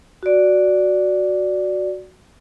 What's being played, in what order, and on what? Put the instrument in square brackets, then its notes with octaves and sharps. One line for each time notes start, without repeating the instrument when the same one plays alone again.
[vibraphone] F#4 D5